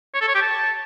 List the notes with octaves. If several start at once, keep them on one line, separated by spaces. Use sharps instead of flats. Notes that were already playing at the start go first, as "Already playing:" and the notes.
C#5
A4
C#5
G4
A5